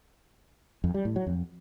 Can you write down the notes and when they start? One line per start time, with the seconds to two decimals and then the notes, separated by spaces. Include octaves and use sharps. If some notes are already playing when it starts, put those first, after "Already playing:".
0.84 F2
0.94 G3
1.05 A2
1.16 F#3
1.27 F2